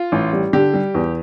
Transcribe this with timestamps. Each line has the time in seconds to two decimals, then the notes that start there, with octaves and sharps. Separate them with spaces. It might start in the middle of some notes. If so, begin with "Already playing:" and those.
Already playing: F4
0.12 A1
0.33 G3
0.53 D3 G4
0.74 G3
0.95 E2